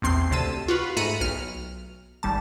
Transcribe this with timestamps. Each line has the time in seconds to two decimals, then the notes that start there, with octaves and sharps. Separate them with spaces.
0.02 A#1 E2 C4 C6 C7
0.31 D2 C3 A5 E6 D#7
0.68 F4 F#4 B4
0.96 G#2 A3 A#5 B5 C#7 D#7
1.21 B1 F6
2.23 G#1 G3 A5